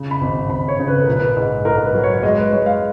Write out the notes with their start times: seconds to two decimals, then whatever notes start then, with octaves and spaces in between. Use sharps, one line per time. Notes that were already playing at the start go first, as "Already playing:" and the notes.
Already playing: C#3
0.11 B5
0.21 G#1
0.49 G#1 B5
0.68 C#5
0.79 C#3
0.88 B4
1.02 A#1 A#4
1.16 B4
1.37 G#2
1.65 G#2 A#4
1.77 A#4
1.84 B4
1.94 F#3
2.03 C#5
2.23 G#3 D#5
2.38 B4
2.52 G#3 C#5
2.66 F5